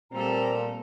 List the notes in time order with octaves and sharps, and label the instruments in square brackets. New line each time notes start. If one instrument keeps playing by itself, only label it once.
[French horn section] A#2 [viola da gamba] G3 A3 A4 [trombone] C4 [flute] A#5